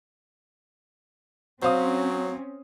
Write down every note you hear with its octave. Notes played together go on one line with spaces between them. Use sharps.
F#3 C4 C#4 C5 F5 D#6